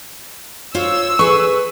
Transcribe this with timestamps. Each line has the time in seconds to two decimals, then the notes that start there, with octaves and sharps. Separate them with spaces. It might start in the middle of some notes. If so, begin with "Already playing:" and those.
0.75 F4 C5 C#5 E6
1.19 G#4 B4 C#6